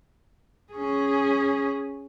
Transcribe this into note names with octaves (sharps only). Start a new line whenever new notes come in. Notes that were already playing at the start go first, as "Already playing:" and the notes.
C#4 G#4